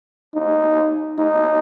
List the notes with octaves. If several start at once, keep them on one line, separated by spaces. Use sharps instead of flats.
D#4
D#4